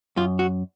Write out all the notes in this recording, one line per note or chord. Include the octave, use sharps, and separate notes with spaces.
F#2 F4
F#4